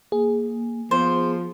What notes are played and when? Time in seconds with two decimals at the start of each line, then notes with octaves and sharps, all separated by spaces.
0.12 A#3 G#4
0.91 F3 B3 C5